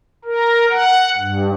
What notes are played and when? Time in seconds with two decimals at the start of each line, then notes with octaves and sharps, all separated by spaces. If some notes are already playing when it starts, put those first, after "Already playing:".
0.25 A#4
0.70 F#5
1.17 G2